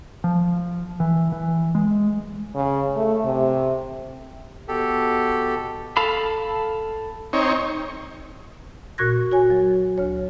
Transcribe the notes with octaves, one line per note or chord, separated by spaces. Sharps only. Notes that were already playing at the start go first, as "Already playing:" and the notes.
F3
E3
E3
G#3
C#3
A3
C3
B2 G4 A4
A4 F5 B5
C4 D#4 C#5
A#2 F#4 C#6 F#6 G#6 A#6
F#4 C#5 G#5
F#3
D2 C#5